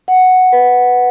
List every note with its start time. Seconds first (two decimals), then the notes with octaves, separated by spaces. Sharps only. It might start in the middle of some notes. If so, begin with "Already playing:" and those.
0.08 F#5
0.52 B4